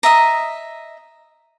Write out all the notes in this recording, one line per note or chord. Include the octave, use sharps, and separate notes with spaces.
D#5 E5 A#5